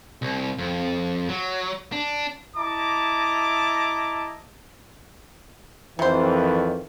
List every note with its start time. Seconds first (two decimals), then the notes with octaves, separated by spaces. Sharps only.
0.22 C2
0.59 F2
1.29 F#3
1.92 D4
2.57 E4 D#5 A5 A#5 D6
5.99 F2 C3 D#3 E3 C5